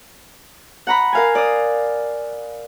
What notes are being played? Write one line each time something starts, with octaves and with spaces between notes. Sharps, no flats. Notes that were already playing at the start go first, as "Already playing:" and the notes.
F#5 A#5 B5
A#4 F5 G#5
D5 D#6